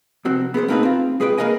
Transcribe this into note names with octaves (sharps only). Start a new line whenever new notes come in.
C2 F2 C4 F#4
B3 G#4 A#4 C5
A3 A#3 C4 D#4 G#4 B4
C4 F4
G#3 G#4 B4 D5 G5
A#3 G#4 A#4 B4 D#5 G#5